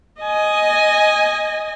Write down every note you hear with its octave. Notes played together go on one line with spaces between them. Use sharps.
D#5 G#5